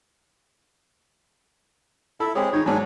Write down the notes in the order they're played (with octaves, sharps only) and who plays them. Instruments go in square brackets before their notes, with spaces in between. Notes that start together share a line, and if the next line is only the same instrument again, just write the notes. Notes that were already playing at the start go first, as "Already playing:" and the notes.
[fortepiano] E4 A4 [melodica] E5 B5
[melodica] G#3 G#4 [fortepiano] C4 G4 C#5
[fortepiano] D#3 D#4 [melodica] C#5
[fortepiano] G#2 D#3 F#3 [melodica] D4 G#5